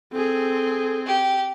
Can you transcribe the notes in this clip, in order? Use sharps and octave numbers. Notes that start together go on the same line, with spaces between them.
C4 G#4 A4
G4